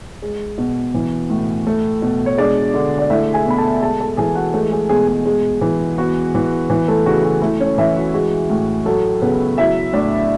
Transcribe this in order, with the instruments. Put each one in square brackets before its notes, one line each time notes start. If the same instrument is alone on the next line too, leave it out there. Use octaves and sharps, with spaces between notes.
[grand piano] G#3
B2
E3
A2
A3
B2
C#5
G#3 D4 D5
D3
D5
A3 E4 E5
G#4 G#5
B2 B5
A4 A5
G#3 A4 A5
A4 A5
E3 G#4 G#5
F#4 F#5
G#3 A3 A4
G#3 G#4
B2 G#3 G#4
G#3 G#4
G#3
E3
B3 F#4
E3
E3
A3 A4
C#3 F#4
F#4
A3 E4
C#4 C#5
E3 E4 E5
F#4
G#3 F#4
A2
F#3 A3 A4
C#3 B3 B4
F#3 E4 E5
A2 D4 D5